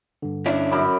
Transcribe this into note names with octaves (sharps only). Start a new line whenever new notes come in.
G2 D3
C#4 D4 E4
F#2 B5 D6